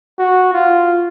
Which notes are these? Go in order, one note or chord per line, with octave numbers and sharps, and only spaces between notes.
F#4
F4